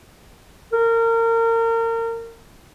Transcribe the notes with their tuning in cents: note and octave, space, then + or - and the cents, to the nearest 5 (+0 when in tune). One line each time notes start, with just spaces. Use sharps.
A#4 -30